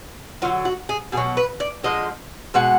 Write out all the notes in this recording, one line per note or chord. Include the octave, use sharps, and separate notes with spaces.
D3 F#3 F4
F#4
G#4
B2 G#4
F#3
B4
D5
D3 F3 G#3 D#5
B2 G#3 F#5